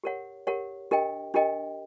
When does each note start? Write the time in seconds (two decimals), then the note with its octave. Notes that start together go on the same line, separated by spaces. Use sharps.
0.04 G4 A#4 C#5 F#5
0.47 G4 A#4 C#5 F#5
0.91 D4 G4 A#4 D#5 G5
1.34 D4 G4 A#4 D#5 G5